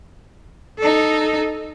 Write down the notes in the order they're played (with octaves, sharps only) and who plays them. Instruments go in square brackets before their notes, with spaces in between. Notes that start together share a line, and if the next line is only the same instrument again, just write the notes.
[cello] D#4 A4